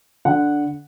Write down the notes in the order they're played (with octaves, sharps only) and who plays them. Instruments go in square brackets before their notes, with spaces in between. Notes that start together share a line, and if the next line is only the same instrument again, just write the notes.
[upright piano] D3 F#5